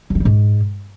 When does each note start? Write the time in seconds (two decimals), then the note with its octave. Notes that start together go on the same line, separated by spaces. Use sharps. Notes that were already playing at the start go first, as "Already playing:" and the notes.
0.10 F#3
0.15 G#3
0.20 G2
0.25 G#2